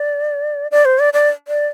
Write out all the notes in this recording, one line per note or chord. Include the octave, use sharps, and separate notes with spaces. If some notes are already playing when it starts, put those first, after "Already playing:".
Already playing: D5
D5
C5
D5
D5
D5